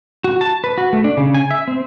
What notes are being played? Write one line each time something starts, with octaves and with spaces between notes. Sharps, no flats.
F#4
A5
B4
F#4
A3
D4
C#3
G#5
E5
C4